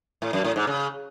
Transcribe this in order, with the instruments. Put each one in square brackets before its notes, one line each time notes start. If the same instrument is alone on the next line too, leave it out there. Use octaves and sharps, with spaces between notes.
[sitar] A2
F#2
A2
G#2
C#3